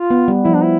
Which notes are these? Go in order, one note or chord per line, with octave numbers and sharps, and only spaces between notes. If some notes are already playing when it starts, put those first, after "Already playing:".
Already playing: F4
B3
G3
F3 E4
D4
E4